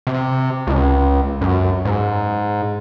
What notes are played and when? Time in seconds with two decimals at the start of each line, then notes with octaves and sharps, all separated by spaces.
0.07 C3
0.67 C#2
1.41 F#2
1.85 G#2